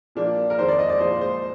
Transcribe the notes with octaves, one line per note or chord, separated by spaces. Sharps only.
A#2 F3 A#3 D4
A#4
F2 D#3 G#3 C5
D5
D#5
D5
A#2 F3 G#3 C5
C5